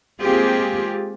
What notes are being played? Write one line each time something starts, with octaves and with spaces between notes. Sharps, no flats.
G#3 A#3 C4 F4 G4 G#4